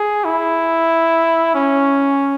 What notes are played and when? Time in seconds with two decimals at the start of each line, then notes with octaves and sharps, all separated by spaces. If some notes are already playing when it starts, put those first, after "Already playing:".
Already playing: G#4
0.24 E4
1.55 C#4